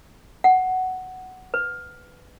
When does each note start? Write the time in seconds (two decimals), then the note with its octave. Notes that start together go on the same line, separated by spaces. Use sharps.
0.44 F#5
1.54 B4